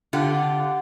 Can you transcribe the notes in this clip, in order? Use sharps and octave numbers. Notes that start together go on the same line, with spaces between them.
D3 F4 G4 F#5